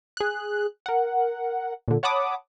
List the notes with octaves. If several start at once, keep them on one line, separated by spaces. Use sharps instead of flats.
G#4 F#6
A#4 F#5
A#2 D3
C#5 F#5 A5 B5 D6 D#6